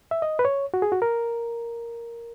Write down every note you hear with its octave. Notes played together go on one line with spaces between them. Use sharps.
E5
D#5
B4
C#5
F#4
G#4
F#4
A#4